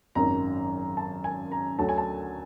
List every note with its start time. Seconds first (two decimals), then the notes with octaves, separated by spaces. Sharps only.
0.15 G#1 F#2 D#3 A#5
0.97 A5
1.24 G#5
1.52 A#5
1.79 D2 D3 F#3 A3 A5
1.89 G#5
1.98 A5